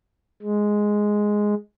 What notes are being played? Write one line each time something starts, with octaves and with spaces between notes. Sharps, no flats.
G#3